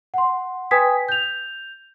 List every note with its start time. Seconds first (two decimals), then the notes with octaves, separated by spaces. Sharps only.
0.14 F#5 C6
0.71 B4 G5 G#5 D#6 G#6 B6
1.09 G6 F7